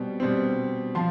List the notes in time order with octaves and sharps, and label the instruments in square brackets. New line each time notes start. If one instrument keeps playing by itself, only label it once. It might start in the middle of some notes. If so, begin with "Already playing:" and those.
Already playing: [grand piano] B2 G3 C4
B2 G3 C4
F3 A5 C6